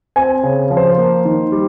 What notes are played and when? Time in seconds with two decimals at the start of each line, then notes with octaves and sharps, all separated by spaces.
0.16 C4 G#5
0.43 C#3
0.70 F3
0.77 C5
0.98 A#3
1.25 D#3
1.52 G3